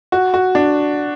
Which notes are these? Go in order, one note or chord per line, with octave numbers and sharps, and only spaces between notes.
F#4
F#4
D4